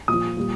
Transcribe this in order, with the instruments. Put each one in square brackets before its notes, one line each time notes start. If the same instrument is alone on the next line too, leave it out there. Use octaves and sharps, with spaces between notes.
[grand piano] A#2 D#6
F3
A#2 G3